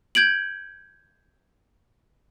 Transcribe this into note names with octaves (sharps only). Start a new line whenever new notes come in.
G6 G#6 D7 F#7